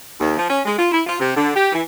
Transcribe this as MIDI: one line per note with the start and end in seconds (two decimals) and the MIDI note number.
0.21 0.33 39
0.38 0.49 53
0.50 0.60 61
0.65 0.76 56
0.78 0.88 65
0.92 1.02 64
1.06 1.18 65
1.20 1.31 48
1.37 1.53 50
1.56 1.71 67
1.72 1.81 52